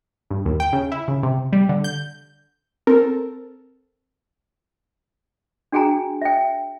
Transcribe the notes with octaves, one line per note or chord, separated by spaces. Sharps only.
G2
D#2
G5
C#3
E4
C#3
C3
G3
D3
G6
C4 A4 A#4
D4 F#4 G#4 G5 G#5 A#5
E5 G5